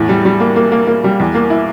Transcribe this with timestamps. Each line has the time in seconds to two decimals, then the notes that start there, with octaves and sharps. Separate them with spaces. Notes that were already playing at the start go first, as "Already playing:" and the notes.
Already playing: E2 A2
0.09 G3
0.25 G3
0.40 A#3
0.56 A#3
0.72 A#3
0.87 A#3
1.04 G3
1.20 E2
1.35 A#3
1.50 E4